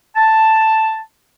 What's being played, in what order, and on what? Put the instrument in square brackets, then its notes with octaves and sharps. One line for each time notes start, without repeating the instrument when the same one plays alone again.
[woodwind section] A5